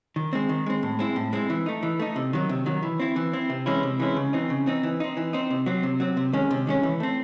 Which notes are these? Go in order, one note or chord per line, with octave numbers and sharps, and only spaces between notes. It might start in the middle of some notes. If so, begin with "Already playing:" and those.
D#3
G#3 C4
D#3
G#3 C4
A2
G#3 C4 E4
A2
G#3 C4 E4
E3
A3 D#4
E3
A3 D#4
C3
D#3 F#3
C3
D#3 F#3
E3
C4 E4
E3
C4 E4
C3
E3 G#3 C#4 E4
C3
E3 G#3 C#4 E4
C#3
E3 C4 D#4
C#3
E3 C4 D#4
E3
C4 D#4
E3
C4 D#4
C3
F#3 C4
C3
F#3 C4
C3
D#3 G#3 C#4
C3
D#3 G#3 C#4
E3
A3 C4